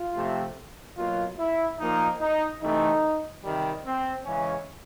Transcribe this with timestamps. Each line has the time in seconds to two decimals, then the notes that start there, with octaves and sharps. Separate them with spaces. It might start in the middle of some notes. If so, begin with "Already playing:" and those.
Already playing: F4
0.15 C3 F3 A3 C4
0.97 B2 F#3 A#3 F4
1.38 E4
1.79 A#2 F3 A#3 D#4
2.20 D#4
2.61 C3 E3 A3 D#4
3.43 C3 D#3 G3
3.85 C4
4.25 C#3 E3 G#3 C#4